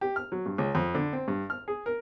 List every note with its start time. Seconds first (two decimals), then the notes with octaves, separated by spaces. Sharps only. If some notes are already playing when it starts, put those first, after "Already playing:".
0.01 G4
0.16 F6
0.32 F#3
0.46 G2
0.58 C#2
0.75 F2
0.95 D3
1.13 C4
1.28 G2
1.50 F6
1.68 G#4
1.86 A#4